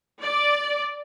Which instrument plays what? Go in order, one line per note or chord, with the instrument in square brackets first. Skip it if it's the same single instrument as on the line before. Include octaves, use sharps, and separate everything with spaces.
[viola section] D5